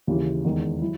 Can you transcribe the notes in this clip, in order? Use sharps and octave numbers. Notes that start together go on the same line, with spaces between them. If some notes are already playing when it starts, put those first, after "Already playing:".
D#2 C#3 E3
E2 D#3 G#3
F#3 E4